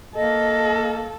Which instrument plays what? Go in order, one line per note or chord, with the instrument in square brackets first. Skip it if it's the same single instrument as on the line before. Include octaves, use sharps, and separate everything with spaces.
[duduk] A#3 [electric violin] A4 [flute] D#5